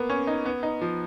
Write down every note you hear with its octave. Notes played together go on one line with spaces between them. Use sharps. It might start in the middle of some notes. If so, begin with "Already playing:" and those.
Already playing: A#3 B3
C#4
D#4
B3
D#4
F3